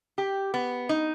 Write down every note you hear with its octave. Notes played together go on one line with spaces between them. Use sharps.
G4
B3
D#4